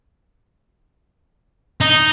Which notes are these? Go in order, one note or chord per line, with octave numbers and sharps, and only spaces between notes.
D#4